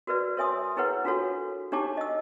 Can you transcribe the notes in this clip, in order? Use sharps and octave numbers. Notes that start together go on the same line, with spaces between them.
F#4 A#4 B4 D5
A#4 C#5 E5 G#5 C6 D#6
E4 G#4 A#4 B4 C#5 F#5
D4 F4 F#4 A4 C#5
D4 D#4 G4 C#5 A5 D6
D#5 E6